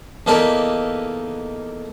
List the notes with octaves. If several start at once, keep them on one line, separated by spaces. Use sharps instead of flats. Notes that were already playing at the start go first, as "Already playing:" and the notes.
E2 A#3 D#4 A4 B4 D5